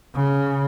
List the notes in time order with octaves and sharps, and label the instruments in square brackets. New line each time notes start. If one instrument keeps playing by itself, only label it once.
[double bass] C#3